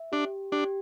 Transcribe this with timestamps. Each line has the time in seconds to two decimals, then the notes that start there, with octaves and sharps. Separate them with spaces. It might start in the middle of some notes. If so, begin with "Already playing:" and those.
Already playing: E5
0.12 D4 G4
0.52 D4 G4